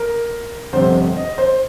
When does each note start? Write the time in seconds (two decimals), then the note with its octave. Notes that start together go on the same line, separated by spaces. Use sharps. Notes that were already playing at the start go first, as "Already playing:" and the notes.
Already playing: A#4
0.73 G1 F2 C3 C5
1.17 D#5
1.38 C5